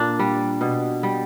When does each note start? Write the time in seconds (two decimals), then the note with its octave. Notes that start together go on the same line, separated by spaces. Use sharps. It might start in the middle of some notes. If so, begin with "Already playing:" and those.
Already playing: A#2 D4
0.19 G3
0.61 B2
1.03 G3